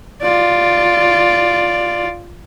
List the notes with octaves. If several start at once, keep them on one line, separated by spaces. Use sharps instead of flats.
F4 D5